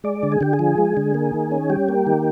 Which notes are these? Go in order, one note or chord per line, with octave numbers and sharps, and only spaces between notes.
G#3 D5
D3
G#4
D3 G4
G#4
F3
G#3
D3
A#3
D#3
C#4
G3 G4
A#3
D#3